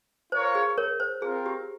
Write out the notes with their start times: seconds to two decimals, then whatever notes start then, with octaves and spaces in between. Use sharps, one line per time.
0.32 F4 A#4 C5 C#5 F5
0.55 G#4
0.78 A#4 C#5
1.00 C5
1.22 C4 F4 G#4 A#4
1.46 G4